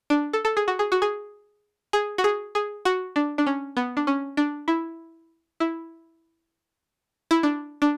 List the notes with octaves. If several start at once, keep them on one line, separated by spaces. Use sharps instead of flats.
D4
A4
A4
G#4
F#4
G#4
F#4
G#4
G#4
F#4
G#4
G#4
F#4
D4
D4
C#4
B3
D4
C#4
D4
E4
E4
E4
D4
D4